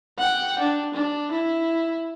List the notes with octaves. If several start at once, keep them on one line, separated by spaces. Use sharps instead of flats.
F#5 G5
D4
D4
E4